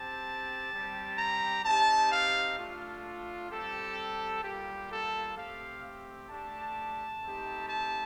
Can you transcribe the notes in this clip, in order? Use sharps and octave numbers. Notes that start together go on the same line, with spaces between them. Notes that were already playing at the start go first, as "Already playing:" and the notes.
Already playing: C4 G4 A5
G3 C4 G4
A#5
C4 D#4 G4 A5
F5
A3 D4 F4
G3 C4 G4 A4
G3 A#3 F4 G4
A4
A3 C4 G4 F5
A3 D4 G4 A5
A3 C4 D#4 G4
A5